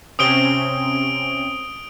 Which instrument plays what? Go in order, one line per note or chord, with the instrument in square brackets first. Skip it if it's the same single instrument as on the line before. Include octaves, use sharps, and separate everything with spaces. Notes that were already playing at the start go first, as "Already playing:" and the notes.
[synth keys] C3 C4 C#4 [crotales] D#6 D7 G7